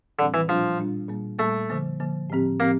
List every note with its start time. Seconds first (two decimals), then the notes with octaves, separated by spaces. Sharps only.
0.19 A2 D3 E3 G3 C4
0.34 E3
0.48 A#2 F3 G3 D4 F4
0.79 A#2 G3 D4 F4
1.09 A#2 G3 A#3
1.39 A#2 G3 A3 A#3
1.70 D3 F3 A#3
2.00 D3 F3 A#3
2.30 A2 F3 C4 G4
2.60 A2 F3 A#3 C4 G4